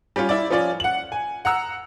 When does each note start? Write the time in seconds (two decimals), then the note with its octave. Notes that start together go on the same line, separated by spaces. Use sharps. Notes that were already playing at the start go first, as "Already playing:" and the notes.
0.16 G3 C#4 F4
0.29 E4 D5
0.50 F3 C#4 F4 D5
0.80 F#5 F#7
1.12 G#5
1.45 F#5 A#5 E6